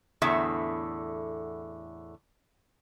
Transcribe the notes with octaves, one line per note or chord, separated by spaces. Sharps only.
E2 A2 D3 B3 E5